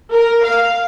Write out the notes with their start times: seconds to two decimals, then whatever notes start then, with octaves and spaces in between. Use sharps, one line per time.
0.13 A#4
0.45 F5